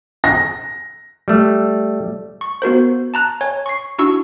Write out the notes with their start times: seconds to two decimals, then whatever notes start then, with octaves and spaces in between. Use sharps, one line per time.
0.24 A#6
1.28 G3 A3
2.41 C#6
2.62 B3 F#4 A#4 C5
3.14 A5 A#5 F#6
3.41 C#5 G#5
3.66 C#6 C7
3.99 D4 E4 F#4 C#6 E6